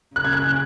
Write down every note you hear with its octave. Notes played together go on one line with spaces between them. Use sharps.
C#3 F#6
G#6
F#6